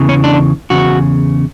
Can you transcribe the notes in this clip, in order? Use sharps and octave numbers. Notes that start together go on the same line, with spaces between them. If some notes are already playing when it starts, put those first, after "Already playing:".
Already playing: E2 C#3 E3
C#4
D4
E2 C#3 F#4